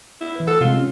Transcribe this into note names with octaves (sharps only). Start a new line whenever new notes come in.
E4
E3 B4
A4 F#5
C3 G#3 F4
C#4